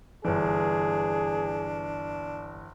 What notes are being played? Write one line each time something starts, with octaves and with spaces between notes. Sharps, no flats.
G1 E3 D4 G#4